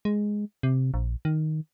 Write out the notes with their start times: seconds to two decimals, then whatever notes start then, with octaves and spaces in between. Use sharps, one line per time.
0.05 G#3
0.63 C3
0.94 A#1
1.25 D#3